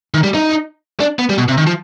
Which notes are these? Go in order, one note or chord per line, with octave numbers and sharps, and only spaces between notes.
D#3
G3
D#4
D4
B3
G3
B2
C3
D#3
F3